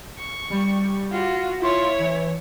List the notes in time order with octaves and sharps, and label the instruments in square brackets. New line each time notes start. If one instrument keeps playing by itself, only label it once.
[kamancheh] C#6
[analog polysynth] G3
[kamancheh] F4 F#4
[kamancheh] E4 C#5 [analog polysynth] F4 C6 C#6
[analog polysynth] E3